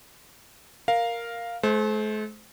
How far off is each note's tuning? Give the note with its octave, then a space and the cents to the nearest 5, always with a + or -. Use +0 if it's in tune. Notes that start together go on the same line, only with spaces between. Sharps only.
A#4 +0 F5 +0
A3 -45 C5 +0